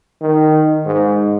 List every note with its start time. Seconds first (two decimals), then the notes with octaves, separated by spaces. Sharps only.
0.21 D#3
0.86 G#2